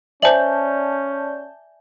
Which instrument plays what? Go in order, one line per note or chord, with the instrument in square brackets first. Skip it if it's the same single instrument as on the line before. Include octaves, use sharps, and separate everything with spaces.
[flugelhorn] C#4 [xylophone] C5 F#7 [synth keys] D5 A5 G6 [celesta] E5 G#5